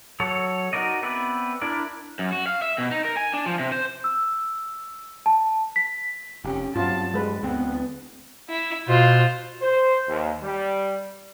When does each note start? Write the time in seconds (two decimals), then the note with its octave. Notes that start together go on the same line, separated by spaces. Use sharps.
0.20 F#3 A4 C#5
0.73 D#4 F#4 A#4 D5 D#5
1.03 B3 C4 B4 D5 E5
1.62 D4 E4 A#4 D5
2.19 F#2
2.32 F#4
2.47 F5
2.62 E5
2.78 B2
2.91 D#4
3.05 A#4
3.17 G#5
3.33 D4
3.46 F3
3.59 C3
3.72 C5
4.04 E6
5.26 A5
5.76 B6
6.44 F1 C#4 G4
6.76 G2 F#3 C4 C#4 F4 A5
7.14 G3 G#3 B4
7.43 D2 B3 C4
8.49 E4
8.88 B2 F4 C5
9.62 C5
10.08 D#2
10.43 G3